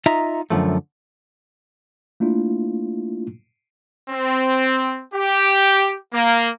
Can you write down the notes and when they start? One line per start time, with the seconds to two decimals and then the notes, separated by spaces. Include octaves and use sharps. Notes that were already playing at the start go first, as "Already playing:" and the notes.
0.06 D#4 F4 D#5 E5 A#5
0.50 F#2 D3 F3 A3
2.20 A3 A#3 D4 E4 F4
4.11 C4
5.15 G4
6.13 A#3